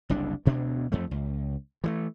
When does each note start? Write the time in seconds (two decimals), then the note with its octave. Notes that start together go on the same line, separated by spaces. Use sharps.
0.09 F#1 C2 D4
0.45 D2 B2 A#3 D4
0.92 F2 F3 A3
1.11 C#2
1.84 E3 F#3 A3